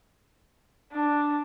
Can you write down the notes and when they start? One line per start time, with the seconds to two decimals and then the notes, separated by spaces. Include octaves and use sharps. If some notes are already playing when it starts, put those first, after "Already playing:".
0.91 D4